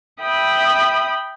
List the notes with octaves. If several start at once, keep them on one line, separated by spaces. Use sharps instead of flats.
E5 G5 B5 D#6